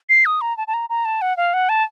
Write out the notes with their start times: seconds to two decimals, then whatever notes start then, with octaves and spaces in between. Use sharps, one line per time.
0.09 C7
0.26 D#6
0.41 A#5
0.57 A5
0.68 A5
0.74 A#5
0.89 A#5
1.05 A5
1.22 F#5
1.37 F5
1.54 F#5
1.69 A5